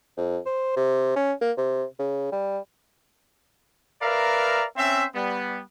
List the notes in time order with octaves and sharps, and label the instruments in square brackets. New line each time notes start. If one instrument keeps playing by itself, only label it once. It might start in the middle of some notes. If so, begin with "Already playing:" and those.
[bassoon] F2
C5
C3
C#4
A#3
C3
C#3
G3
[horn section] A#4 B4 D5 E5 F5 A#5
C4 C#4 C5 E5
G3 B3